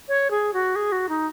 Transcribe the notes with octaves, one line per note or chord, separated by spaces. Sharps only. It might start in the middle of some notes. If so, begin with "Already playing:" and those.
C#5
G#4
F#4
G#4
F#4
D#4